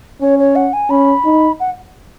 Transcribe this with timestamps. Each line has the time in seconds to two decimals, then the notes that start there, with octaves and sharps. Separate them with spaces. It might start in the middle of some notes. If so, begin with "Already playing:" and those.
0.21 C#4 C#5
0.39 C#5
0.56 F#5
0.73 G#5
0.90 C#4 B5
1.25 D#4
1.60 F#5